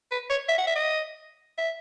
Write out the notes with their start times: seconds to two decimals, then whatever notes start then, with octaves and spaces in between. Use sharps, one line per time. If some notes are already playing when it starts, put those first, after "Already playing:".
0.12 B4
0.30 C#5
0.49 E5
0.58 F#5
0.67 E5
0.76 D#5
1.58 E5